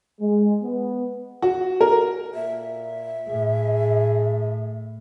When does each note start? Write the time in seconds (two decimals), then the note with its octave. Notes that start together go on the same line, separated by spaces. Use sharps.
0.21 G#3
0.63 B3
1.42 F#4
1.81 A#4
2.34 A#2 E5
3.29 A2 G#4